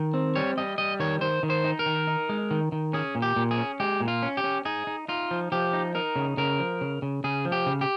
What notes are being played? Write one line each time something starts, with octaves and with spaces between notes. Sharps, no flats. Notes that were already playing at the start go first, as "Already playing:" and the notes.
Already playing: D#3
C4
G3 C#5
G3 D#5
G3 D#5
D#3 C#5
D#3 C5
D#3
C5
D#4
A#4
D#3
D#4
G#3
D#3
D#3
C#4 G#4
A#2
G4
A#2
G#4
C#4
G#3 G4
A#2
F4
C#4
G4
C#4
D#4 G#4
D#4
D#4 F4
F3
F3 G4
D#4
D#4 A#4
C#3
C#3 A#4
F3
C#3
C#3
C#3 G#4
F3
G4
C#3
G4